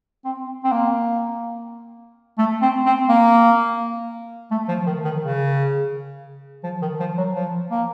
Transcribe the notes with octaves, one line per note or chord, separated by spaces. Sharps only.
C4
C4
A#3
A3
C4
C4
A#3
A3
F3
D#3
D#3
C#3
F3
D#3
F3
F#3
F3
A#3